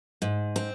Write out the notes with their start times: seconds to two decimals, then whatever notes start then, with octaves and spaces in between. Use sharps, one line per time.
0.22 G#2
0.56 C4